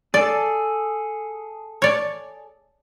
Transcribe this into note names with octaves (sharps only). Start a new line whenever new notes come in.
G#4 A4 D5
C#5 D5